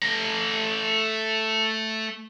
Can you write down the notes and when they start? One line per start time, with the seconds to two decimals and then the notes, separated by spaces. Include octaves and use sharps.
0.02 A3 A#5